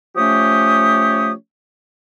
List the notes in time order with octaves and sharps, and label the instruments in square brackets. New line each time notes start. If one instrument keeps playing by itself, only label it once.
[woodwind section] F3 A3 C#4 G4 C#5 D#6